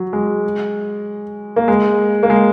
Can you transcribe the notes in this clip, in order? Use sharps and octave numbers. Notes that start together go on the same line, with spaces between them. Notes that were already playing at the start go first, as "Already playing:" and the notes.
Already playing: F#3
G#3
A#3
G#3
A#3
G#3